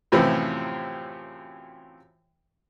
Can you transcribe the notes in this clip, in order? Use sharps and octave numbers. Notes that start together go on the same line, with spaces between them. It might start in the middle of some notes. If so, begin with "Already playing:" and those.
F#2 A2 C3 E3 F3 C4